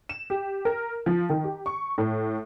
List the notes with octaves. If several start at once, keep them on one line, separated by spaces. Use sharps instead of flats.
E7
G4
A#4
F3
D#3
G4
C#6
A2